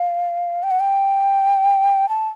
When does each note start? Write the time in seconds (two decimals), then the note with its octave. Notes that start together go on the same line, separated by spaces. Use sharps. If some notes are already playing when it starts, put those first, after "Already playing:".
Already playing: F5
0.63 G5
0.71 F#5
0.80 G5
2.09 A5